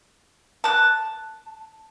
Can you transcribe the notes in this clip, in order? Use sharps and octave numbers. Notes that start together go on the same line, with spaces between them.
A5 F#6